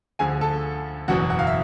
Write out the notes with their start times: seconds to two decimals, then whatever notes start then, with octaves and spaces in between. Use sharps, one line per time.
0.19 D2 D3 F3 G#4 G#5
0.41 A4 A5
1.08 F#1 E2 B2 F#3 F#4 F#5
1.30 F#5
1.39 F5
1.47 E5